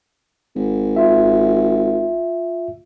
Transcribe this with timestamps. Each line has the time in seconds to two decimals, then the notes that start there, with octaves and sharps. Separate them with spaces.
0.56 G#1
0.96 F4 E5